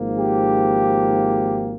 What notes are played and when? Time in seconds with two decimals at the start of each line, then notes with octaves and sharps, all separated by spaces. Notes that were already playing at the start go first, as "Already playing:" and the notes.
Already playing: G#1 G#2 F3 A#3
0.18 G4